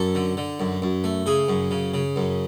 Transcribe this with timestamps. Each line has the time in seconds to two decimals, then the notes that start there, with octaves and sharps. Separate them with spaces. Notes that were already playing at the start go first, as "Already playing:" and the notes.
Already playing: F#2 A4
0.15 D3
0.37 D3
0.60 F#2
0.82 F#2
1.04 A3
1.26 C#3 G#4
1.48 F#2
1.71 C#3
1.94 C#3
2.16 F#2